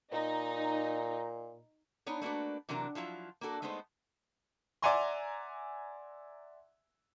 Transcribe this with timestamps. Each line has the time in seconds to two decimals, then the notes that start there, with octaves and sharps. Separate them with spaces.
0.13 A#2 D#4
2.06 B3 D4 D#4 C#5
2.21 A3 A#3 D4 F#4 B4
2.69 C3 E3 F#3 D4 A#4
2.95 F3 F#3 E4 F4
3.41 A#3 D4 F#4 A4
3.62 G#3 A3 B3 D#4 C5
4.82 D5 E5 F#5 G#5 A#5 C6